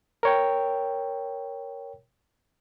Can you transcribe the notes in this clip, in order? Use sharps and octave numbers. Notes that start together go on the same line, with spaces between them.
A#4 C#5 G5